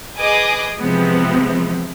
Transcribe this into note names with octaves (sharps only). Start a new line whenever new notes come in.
G#4 B4 D#5 G#5 D6 D#6
C3 E3 F3 G#3 B3 C4